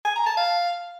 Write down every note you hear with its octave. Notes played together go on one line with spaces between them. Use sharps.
G#5
A#5
A5
F5